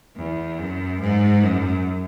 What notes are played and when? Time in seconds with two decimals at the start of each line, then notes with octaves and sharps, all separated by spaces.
0.16 E2
0.59 F#2
1.00 G#2
1.43 F#2